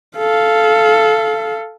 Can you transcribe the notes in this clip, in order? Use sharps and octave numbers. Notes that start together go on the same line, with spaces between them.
A4 F5